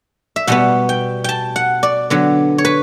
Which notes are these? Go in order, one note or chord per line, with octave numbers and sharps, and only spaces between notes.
E5
B2 G3 B3 F#5
G5
G5 A5
F#5
D5
D3 F#3 B3
C#5
B4